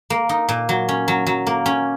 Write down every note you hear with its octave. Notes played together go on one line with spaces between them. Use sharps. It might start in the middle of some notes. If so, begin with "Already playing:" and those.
A#3
D#4
A#2
F#3
C#4
F#3
F#3
A#3
C#4